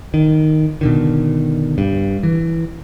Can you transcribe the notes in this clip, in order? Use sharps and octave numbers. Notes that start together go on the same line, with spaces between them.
D#3
B2 D3 D#3
G2
E3